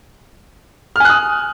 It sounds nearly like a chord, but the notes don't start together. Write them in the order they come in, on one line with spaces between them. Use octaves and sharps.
F6 G#5 F#6 D#6